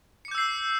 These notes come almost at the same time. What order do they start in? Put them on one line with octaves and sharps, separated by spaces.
C#7 D6 G6 E6 C7